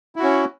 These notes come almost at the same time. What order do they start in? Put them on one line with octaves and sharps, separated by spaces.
E4 F#4 C#4